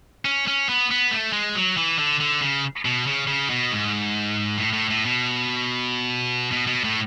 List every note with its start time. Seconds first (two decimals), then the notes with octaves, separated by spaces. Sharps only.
0.25 C#4
0.48 C#4
0.69 B3
0.91 B3
1.11 A3
1.33 G#3
1.55 F#3
1.77 E3
1.99 D3
2.20 D3
2.41 C#3
2.85 B2
3.07 C#3
3.27 C#3
3.50 B2
3.71 G#2
4.58 A2
4.73 A2
4.90 A2
5.05 B2
6.52 B2
6.67 B2
6.84 A2